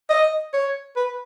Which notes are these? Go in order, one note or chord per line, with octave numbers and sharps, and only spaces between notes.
D#5
C#5
B4